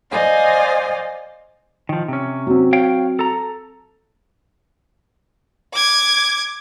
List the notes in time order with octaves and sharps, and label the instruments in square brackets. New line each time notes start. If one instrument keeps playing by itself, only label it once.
[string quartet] C5 D5 D#5 F5 G#5
[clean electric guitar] D#3 F3
C3 C#4
[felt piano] F#3 C4
[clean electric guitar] C#5 F5 G5
A4 A#5
[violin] D6 G#6